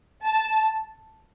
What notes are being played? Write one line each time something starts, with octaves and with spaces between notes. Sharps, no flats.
A5